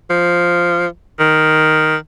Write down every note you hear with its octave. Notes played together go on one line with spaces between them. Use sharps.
F3
D#3